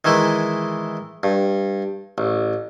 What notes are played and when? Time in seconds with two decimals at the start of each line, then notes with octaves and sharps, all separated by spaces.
0.05 D#3 E3 G#3 E4
1.23 G2
2.18 A1